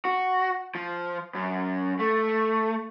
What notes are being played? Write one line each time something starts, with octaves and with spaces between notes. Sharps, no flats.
F#4
F3
F#2
A3